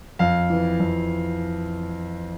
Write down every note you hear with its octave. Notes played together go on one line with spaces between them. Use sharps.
F2 F5
E3
F2